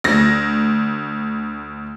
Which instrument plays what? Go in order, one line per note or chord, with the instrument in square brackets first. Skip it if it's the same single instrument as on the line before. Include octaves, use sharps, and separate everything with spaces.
[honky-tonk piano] D2 A#6